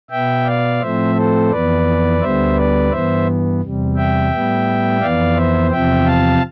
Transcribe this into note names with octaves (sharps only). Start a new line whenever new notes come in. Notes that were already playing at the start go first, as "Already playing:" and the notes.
B2 B3 E5 G5
D5 F5
A2 F3 A3 C4 C5 E5
A4 C5
F2 E3 B3 B4 D5
D2 D3 G3 B3 C5 E5
B4 D5
G2 E3 B3 C5 E5
E2 C3 G3
E5 G5
A2 G3 B3
F2 E3 B3 D5 F5
C5 E5
E2 C3 F3 C4 E5 G5
F5 A5